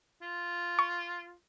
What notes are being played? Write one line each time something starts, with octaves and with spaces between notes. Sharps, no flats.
F4
C#6